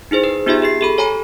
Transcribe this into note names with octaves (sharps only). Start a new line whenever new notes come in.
D#4 E4 G#4 C5
B4
B3 D#4 F4 G4 G#4 E5
G4 G#4 C7
G4 A4 B5
A4 C#5 G#5 A#5 B5